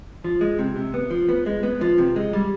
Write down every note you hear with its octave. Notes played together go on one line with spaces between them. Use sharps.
F3
G#3
C3
C3
B3
F3
B3
G#3
B3
F3
C3
G#3
G3